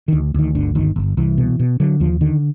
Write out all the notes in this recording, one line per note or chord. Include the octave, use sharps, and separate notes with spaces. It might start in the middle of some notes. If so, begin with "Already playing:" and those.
D2 D#3
D2 D#3
G1 D3
G1 D#3
G1
C2 E3
B2
B2
D3 F#3
D#2 F3
D3 D#3